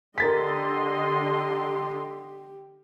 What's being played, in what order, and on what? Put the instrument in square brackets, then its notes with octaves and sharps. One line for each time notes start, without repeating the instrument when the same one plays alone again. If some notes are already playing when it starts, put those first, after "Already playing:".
[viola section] D3 D#5 C6 [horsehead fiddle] G4 [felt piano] A#4 A6 B6